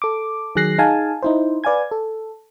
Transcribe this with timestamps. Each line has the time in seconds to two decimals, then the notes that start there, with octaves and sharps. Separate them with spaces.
0.02 A4 D6
0.55 D#3 F#3 G#4 F#6 A#6 C7
0.78 D#4 G#4 F5 G#5 A5
1.23 D#4 E4 C5
1.64 B4 D5 F5 G#5 G#6
1.91 A4